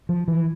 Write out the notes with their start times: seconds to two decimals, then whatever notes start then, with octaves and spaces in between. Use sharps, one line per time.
0.09 F3
0.28 E3